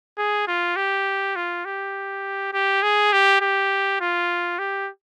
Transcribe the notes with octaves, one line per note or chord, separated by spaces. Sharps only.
G#4
F4
G4
F4
G4
G4
G#4
G4
G4
F4
G4